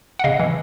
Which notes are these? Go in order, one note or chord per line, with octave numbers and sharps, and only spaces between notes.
F#5
C#3 D#5 F5
E3